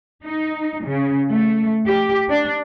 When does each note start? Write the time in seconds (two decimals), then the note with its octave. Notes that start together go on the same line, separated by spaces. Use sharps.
0.24 D#4
0.85 C#3
1.30 A3
1.86 G4
2.29 D4